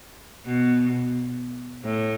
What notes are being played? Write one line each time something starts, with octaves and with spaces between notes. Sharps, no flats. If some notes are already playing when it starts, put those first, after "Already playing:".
B2
A2